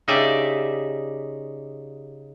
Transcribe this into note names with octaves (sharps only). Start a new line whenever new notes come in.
C#3 D#4 G4 D5 E5